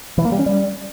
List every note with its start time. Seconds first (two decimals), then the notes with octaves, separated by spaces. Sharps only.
0.18 E3
0.25 A#3
0.32 G3
0.39 C#4
0.46 G3